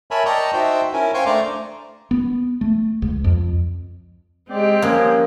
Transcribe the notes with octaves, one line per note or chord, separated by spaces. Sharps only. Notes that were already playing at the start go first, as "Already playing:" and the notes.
A#4 C#5 E5 G#5 A5 B5
D5 D#5 G5 A5 A#5 C#6
D#4 F#4 C5 E5 G5 A5
C#4 E4 A#4 G#5
C5 F5 G5 G#5 C#6
A3 D4 C5 D5 A#5 D6
B3
A3
C#2
F2
G#3 C4 G4 D5 G5
F3 G#3 A#3 C#4